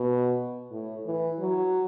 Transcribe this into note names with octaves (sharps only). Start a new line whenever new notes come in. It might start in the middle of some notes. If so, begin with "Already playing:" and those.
Already playing: B2
A2
E3
F#3